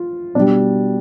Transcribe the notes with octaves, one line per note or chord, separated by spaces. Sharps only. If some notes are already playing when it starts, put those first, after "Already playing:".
Already playing: F4
B2 G3 D4